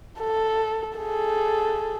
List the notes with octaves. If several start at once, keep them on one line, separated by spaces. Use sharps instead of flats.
A4
G#4 A4